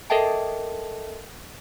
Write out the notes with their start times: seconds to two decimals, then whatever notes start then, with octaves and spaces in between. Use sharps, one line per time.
0.10 A4 A#4 D#5 E5 G5 A5